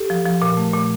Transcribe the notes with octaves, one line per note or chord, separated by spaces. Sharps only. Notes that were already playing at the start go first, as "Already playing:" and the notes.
Already playing: G4 A4
F3
F3
A#2
A3
A#2